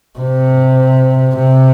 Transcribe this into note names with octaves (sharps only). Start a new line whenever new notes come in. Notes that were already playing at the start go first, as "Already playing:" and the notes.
C3
C3